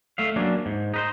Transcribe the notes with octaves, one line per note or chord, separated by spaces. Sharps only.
A3 E5 F5
F#3 A#3 C#4 D4
G#2
D#4 B4 C5